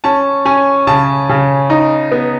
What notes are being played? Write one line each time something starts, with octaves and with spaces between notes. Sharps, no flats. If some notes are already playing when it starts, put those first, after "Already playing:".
C#4 A5
C#4 G#5
C#3 A5
C#3
D#4
B3